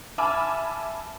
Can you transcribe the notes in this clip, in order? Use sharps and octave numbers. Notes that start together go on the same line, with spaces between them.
E5 G#5 A5 B5 D6 F6